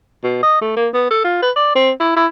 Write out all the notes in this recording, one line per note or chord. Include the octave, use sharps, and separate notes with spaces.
B2
D#5
A3
A#3
B3
A4
F4
B4
D5
C4
E4
E4